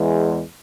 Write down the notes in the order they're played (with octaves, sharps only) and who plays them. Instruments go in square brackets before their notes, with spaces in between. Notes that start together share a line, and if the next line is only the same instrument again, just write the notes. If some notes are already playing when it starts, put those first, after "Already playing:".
Already playing: [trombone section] E2 E3 G#3